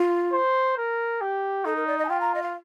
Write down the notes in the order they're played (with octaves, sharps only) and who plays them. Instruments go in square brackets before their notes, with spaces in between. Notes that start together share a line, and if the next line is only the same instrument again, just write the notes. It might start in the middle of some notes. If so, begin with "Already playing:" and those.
Already playing: [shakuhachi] F4
[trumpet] C5
A#4
G4
[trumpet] D#4 [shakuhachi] A4
[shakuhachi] A#4
D5
D#5
A5
[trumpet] F4 [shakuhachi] G5
[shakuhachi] A#5
D#5
F5